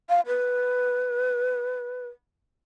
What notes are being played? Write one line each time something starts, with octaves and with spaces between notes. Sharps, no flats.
F5
B4